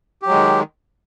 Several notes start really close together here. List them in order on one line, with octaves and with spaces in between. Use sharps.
G4 F#3 G#3 D#3